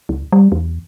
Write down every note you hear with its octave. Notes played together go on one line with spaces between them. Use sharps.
C#2
G3
E2